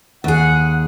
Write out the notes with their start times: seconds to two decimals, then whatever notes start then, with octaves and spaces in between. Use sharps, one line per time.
0.24 D#2 G#4 F#5